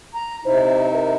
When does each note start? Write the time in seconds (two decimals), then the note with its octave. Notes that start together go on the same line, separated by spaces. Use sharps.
0.14 A#5
0.45 C3 D#4 E4 C5
0.93 A#4